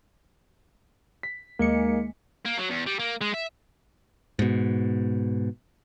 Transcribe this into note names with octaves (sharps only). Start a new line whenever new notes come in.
B6
D#2 G#3 A#3 C#7
A#3
F#3
E2
G3
A#3
G#3
E5
G#2 B2